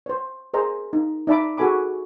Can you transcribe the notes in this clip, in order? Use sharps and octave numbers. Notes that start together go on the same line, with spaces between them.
C5 C#5
G#4 A#4 C5 D#5 A#5
D#4
D#4 D5 E5 A5 B5 D6
F#4 G#4 A4 G#5 B5 D6